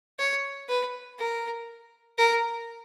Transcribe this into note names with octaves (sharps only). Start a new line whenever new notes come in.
C#5
B4
A#4
A#4